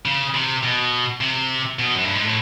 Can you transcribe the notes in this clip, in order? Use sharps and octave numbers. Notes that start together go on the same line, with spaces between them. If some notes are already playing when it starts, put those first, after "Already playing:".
C#3
C3
B2
C3
B2
F#2
G2
G#2
A2